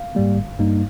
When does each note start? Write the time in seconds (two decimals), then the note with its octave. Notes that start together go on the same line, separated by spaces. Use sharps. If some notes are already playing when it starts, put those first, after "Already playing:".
Already playing: F5
0.15 G#2 G3 A#3
0.37 G1
0.59 G2 G3 A#3 D#4